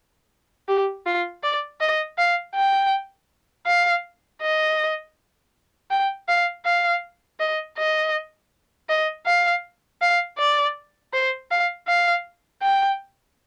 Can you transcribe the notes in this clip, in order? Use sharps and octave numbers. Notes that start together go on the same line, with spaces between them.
G4
F4
D5
D#5
F5
G5
F5
D#5
G5
F5
F5
D#5
D#5
D#5
F5
F5
D5
C5
F5
F5
G5